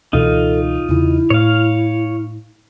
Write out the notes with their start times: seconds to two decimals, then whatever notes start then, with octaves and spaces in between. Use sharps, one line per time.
0.13 C#2 B2 E3 D#4 F4 A4
0.89 E2 C#3 E4
1.30 A2 C#5 F5